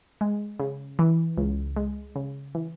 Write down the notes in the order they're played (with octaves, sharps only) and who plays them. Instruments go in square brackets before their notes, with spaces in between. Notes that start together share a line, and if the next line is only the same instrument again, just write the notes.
[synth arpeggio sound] G#3
C#3
E3
C#2
G#3
C#3
E3